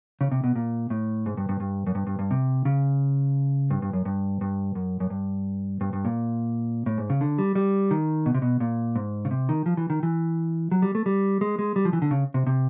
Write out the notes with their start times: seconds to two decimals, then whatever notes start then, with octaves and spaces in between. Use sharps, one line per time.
0.21 C#3
0.32 C3
0.44 B2
0.56 A#2
0.90 A2
1.26 G#2
1.37 G2
1.49 G2
1.60 G2
1.87 F#2
1.95 G2
2.07 G2
2.19 G2
2.31 C3
2.65 C#3
3.71 G2
3.82 G2
3.93 F#2
4.05 G2
4.41 G2
4.75 F#2
5.00 F#2
5.10 G2
5.81 G2
5.93 G2
6.05 A#2
6.86 A2
6.98 G#2
7.10 C#3
7.21 D3
7.38 G3
7.55 G3
7.91 D#3
8.26 B2
8.34 C3
8.42 B2
8.60 A#2
8.96 G#2
9.25 C#3
9.31 C3
9.49 D#3
9.66 F3
9.77 E3
9.90 D#3
10.03 E3
10.72 F#3
10.82 G3
10.95 A3
11.06 G3
11.41 G#3
11.59 G#3
11.76 G3
11.85 F3
11.93 E3
12.02 D3
12.11 C#3
12.34 C3
12.47 C3